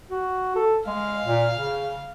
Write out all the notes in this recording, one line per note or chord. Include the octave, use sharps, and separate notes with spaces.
F#4
A4
G#3 F5
A#2
C#3